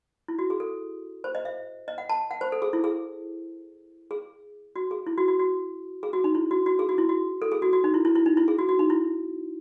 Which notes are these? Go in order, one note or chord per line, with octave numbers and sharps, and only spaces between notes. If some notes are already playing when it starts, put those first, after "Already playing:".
E4
F#4
G#4
A4
C5
D#5
E5
D#5
F#5
A5
F#5
C5
A4
G#4
E4
G#4
G#4
F#4
G#4
E4
F#4
F#4
F#4
G#4
F#4
D#4
E4
F#4
F#4
G#4
F#4
E4
F#4
A4
G#4
F#4
F#4
D#4
E4
E4
E4
D#4
E4
G#4
F#4
F#4
D#4
E4